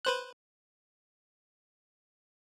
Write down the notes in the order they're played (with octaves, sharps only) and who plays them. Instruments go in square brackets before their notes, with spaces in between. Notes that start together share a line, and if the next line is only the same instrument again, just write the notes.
[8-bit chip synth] B4 C5 F#6